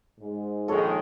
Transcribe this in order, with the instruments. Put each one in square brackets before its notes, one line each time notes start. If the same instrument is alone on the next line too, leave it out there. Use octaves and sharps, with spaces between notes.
[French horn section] G#2
[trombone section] A#1 D#3 G#3 [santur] A4 C#5